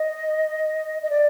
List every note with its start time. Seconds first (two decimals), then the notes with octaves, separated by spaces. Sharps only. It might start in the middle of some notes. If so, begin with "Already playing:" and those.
Already playing: D#5
1.02 D#5
1.10 D5